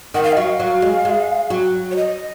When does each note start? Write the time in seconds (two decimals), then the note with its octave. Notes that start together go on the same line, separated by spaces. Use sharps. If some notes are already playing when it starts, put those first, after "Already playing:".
0.14 D#3 F#5
0.23 F5
0.32 D#5
0.37 F#3 F5
0.60 F#3
0.82 G#3
1.05 G#3
1.50 F#3
1.91 C#5
1.96 D#5